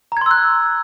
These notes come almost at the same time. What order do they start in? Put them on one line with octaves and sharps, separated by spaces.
A#5 G#6 C6 E6 F#6